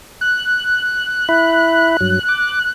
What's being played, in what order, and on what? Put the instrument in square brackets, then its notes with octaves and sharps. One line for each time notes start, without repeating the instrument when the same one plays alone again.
[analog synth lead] F#6
[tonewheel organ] E4 E5 B5
G2 F#3
D6